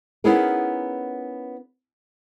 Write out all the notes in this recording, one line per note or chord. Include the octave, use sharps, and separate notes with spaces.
B3 C#4 D#4 E4 G#4 A#4